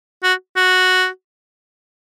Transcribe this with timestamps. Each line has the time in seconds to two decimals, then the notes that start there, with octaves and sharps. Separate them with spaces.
0.23 F#4
0.56 F#4